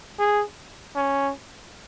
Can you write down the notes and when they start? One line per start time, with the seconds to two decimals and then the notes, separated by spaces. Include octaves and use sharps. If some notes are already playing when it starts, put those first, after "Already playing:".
0.19 G#4
0.96 C#4